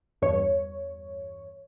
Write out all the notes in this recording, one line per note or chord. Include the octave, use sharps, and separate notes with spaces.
E2 G2 C#5